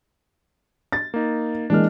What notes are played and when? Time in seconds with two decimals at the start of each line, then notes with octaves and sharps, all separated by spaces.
0.92 A6
1.14 A#3 D#4
1.70 E3 G#3 A#3 D4 F6